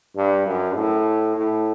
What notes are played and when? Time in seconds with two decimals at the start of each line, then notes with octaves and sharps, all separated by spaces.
0.16 G2
0.46 F#2
0.76 A2
1.37 A2